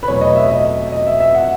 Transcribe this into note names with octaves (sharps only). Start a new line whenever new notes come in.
B4
E2 B2 F#3 A3 C#5
D#5
E5
D#5
D#5
E5
E5
F#5